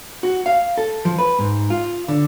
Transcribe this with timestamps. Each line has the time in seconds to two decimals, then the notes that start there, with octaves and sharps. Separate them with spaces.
0.23 F#4
0.46 F5
0.78 A4
1.05 F3
1.18 B4
1.39 G#2
1.70 F4
2.08 D3